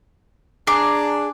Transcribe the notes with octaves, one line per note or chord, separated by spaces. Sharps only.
D4 G#4 A#5 D6 C7